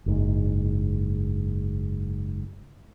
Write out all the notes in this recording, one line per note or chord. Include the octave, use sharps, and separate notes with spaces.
F#1 G#2